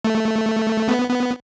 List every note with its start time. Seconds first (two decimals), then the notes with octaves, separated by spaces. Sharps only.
0.05 A3
0.89 B3
1.10 B3